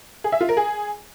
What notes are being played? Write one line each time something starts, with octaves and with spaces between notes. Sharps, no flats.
G#4
E5
F4
A#4
G#4